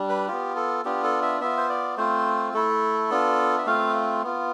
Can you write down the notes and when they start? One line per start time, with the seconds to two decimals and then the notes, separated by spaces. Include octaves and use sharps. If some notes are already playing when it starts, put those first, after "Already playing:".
Already playing: G3 D4
0.09 B4
0.28 B3 F4 G4
0.56 A4
0.85 B3 D4 F4 G4
1.03 A4
1.22 E5
1.41 B3 F4 E5
1.57 C5
1.69 D5
1.97 A3 C4 F4 C5
2.54 A3 E4 A4
3.10 B3 D4 F4
3.58 E5
3.66 A3 C4 F4 F5
4.23 B3 F4